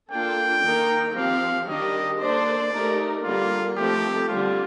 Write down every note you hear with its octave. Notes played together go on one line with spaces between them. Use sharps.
A#3 D4 F4 A4 G5
D#3 A#3 D#4 A#4
F3 C4 G4 F5
D#3 G3 D4 G4 D#5
A#3 D4 A4 C5 D5
A3 D#4 G4 A#4
D3 G3 A#3 F4
F3 A3 C4 D#4 G4 A4
D3 G3 C4 F4